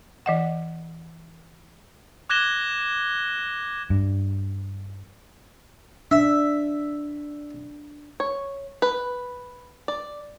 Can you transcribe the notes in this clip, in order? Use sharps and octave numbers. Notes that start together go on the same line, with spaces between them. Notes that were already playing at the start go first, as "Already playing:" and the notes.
E3 D#5 F#5
D6 F#6 G#6 A#6 E7 G7
G2
D4 E5
C#5
B4
D5